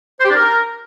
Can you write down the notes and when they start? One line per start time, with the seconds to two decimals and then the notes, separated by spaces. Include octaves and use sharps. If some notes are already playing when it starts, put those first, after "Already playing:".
0.20 C5
0.25 G4
0.30 D4
0.35 A#4